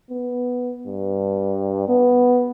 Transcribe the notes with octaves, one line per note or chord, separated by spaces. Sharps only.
B3
G2
B3